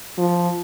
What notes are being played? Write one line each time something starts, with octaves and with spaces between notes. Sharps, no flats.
F3